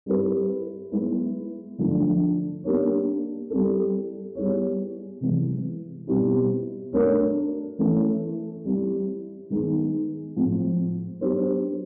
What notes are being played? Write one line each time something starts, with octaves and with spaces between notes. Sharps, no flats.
G3 C4 E4 G4 B4
G#3 B3 E4
D3 F3 A3 D4
A#3 D4 G4 A#4 C#5
G3 C4 E4 A4
G3 B3 E4 G#4 C#5
C3 E3 G#3
B2 G3 C4 E4 G4
A3 D4 F#4 A#4 C#5
E3 A3 C#4 E4
G3 C4 E4
D#3 G#3 B3 D#4 G#4
A2 F3 G#3 C4
F#3 B3 D4 G4 C5